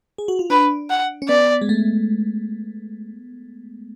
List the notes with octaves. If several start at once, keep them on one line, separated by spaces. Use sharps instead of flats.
G#4
F#4
F4
D4 B4
F#5
C#4
B3 D5
G#3
A3